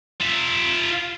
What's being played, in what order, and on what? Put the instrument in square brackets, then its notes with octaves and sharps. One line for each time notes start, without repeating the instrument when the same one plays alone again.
[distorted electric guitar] F4 E5